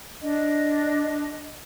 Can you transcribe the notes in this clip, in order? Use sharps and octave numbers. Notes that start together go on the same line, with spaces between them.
D4 D#5